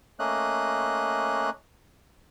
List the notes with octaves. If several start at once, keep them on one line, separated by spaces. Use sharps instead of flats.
A3 A#3 C#4 D#5 F#6